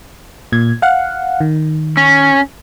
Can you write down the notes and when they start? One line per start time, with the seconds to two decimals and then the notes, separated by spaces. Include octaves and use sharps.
0.52 A#2 G#6
0.82 F5 F#5
1.41 D#3
1.97 C#4